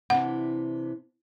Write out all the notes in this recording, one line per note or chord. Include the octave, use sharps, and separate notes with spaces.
C3 E3 D4 F#5